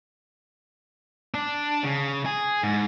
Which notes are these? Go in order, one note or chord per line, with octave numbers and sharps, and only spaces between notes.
D4
C#3
G#4
G#2